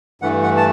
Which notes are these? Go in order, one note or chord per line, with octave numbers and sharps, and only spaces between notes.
G2 E3 A3 F#5
F#5
A5